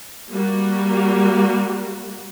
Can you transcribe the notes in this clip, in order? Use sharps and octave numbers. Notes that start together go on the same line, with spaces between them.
G3 A#3 F#4